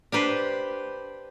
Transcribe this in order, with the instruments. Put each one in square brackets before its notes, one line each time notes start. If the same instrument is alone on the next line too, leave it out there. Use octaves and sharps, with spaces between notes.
[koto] D4 G4 B4 C5